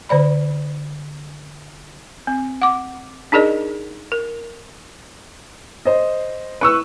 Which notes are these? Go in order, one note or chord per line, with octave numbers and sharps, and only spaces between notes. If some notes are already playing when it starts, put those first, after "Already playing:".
D3 C5 D5 B5
C4
F#5 D6
D4 D#4 G#4 A#4 D5 D#5
A#4
C5 D#5
E4 B4 C#6 E6